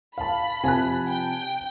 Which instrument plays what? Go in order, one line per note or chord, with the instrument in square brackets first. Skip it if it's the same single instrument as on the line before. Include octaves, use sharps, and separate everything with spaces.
[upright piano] F5 A5 [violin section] B5
[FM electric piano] C3 F3 [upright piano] G#5 A5 F#6
[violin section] G5